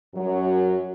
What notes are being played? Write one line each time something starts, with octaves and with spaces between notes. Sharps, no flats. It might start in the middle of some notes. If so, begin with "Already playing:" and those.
F#2 F#3